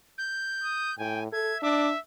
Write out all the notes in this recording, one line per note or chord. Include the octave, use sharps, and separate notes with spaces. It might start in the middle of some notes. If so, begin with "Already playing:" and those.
G6
D#6
A2 G5 G#5
A4 E5 G#6
D4 E5 D6